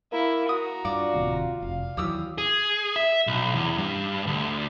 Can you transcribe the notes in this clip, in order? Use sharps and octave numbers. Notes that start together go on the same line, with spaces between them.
A#3 E4
F#4 A#5 D#6
G2 F4 D5
D1 D#2 C3
F1 F5
D#2 E3 F#3 G4 D#6 E6
G#4
E5
B1
E2
G2
D2